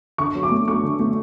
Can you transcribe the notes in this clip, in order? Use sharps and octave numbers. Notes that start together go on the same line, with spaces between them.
D3 C#6
F#3
D6
A3
A3 C#6
D3
A3